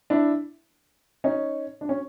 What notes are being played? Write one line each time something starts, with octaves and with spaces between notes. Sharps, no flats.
D4 E4
C#4 D#4
D4
C#4